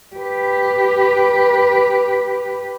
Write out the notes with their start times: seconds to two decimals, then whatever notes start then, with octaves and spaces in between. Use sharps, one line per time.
0.16 G4 B4